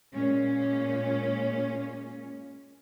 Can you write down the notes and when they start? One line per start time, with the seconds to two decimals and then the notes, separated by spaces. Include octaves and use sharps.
0.12 A#2 G#3 C#4